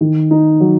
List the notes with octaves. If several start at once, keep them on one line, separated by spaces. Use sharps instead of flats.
D#3
D#4
F#3